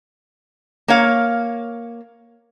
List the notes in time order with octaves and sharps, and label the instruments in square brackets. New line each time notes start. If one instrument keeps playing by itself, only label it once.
[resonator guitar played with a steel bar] A#3 C#5 F5